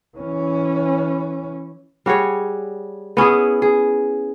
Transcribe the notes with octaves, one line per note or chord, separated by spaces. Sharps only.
E3 C#4
G3 F#4 G#4 C#5
B3 C#4 E4 G#4
G#4